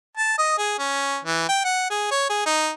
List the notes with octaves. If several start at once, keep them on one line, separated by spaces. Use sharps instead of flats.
A5
D#5
G#4
C#4
E3
G5
F#5
G#4
C#5
G#4
D#4